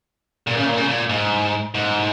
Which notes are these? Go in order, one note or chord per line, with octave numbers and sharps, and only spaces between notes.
A#2
C#3
A#2
C#3
A#2
G#2
G#2